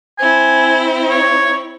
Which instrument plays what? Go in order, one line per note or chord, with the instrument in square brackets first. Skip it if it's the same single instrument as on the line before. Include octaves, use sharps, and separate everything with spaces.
[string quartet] C4 E4 [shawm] G#5
[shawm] C#5